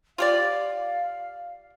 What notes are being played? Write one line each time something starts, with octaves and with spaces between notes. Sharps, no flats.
F4 G4 D5 F5